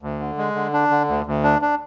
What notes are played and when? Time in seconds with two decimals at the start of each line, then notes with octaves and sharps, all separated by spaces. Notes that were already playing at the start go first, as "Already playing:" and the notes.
0.02 D2
0.20 D3
0.38 G#3
0.55 D3
0.73 D4
0.91 D3
1.09 D2
1.26 D2
1.44 D4
1.62 D4